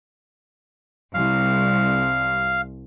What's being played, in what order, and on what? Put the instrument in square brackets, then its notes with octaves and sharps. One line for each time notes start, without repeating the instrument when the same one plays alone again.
[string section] C2 [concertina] F5